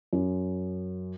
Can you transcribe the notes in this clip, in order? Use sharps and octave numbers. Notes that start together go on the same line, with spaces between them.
F#2